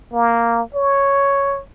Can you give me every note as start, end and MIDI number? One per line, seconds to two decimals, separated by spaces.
0.13 0.62 58
0.75 1.61 73